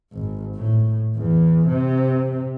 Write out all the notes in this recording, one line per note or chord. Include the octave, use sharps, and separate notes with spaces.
G#1
A2
E2
C3